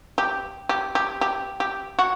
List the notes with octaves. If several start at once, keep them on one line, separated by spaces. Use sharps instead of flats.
G4
G4
G4
G4
G4
F#4